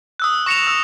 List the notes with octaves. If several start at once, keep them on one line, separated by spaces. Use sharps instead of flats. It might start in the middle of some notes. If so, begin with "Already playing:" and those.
D#6 E6 F#6
C#6 A#6 C#7 E7 F7
E6